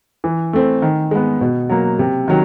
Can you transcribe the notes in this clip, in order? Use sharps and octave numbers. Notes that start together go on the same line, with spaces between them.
E3
A3 C4
D#3
G#3 B3
B2
F#3 A#3
C3
D#3 F#3